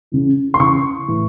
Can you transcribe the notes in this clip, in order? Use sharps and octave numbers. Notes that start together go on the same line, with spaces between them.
C#3 E3
C6
C#3 E3 C#6
A2 E3